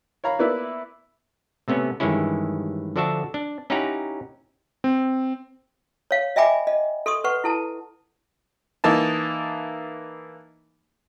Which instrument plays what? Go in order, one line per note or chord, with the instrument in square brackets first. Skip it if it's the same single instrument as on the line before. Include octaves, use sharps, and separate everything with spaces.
[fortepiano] C#5 F5 A#5 B5
A#3 B3 E4 B4 D5 E5
[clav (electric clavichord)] C3 A3 B3 C#4
G2 D#3 E3 G#3 C#4 E4
D3 F3 D4 F#4 E5 A5
D4
C#4 D#4 E4 G4 F#5 A#5
[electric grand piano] C4
[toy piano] C#5 F5
D#5 E5 G5 G#5 B5 D6
D#5
A4 C6 C#6 D#6
B4 F#5 C#6
E4 A4 A5
[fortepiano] E3 A#3 D#4 A5